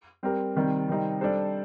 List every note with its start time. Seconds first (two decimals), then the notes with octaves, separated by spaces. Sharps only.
0.23 G3 C4 G4 A#4
0.55 C3 D#3 G3 C4
0.88 C3 D#3 G3 C4 D#4
1.21 G3 D4 A4 C5